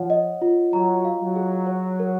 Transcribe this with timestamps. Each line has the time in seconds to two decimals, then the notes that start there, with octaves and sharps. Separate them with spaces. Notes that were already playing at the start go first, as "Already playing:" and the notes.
Already playing: F3 C#5 F#5
0.10 D#5
0.42 F4
0.73 F#3 A#5
1.05 F5
1.20 F#3
1.36 G#4
1.67 C#5
1.99 A#4